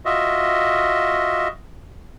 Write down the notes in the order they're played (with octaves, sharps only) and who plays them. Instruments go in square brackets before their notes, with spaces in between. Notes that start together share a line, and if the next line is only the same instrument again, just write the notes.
[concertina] F4 F#4 D#5 E5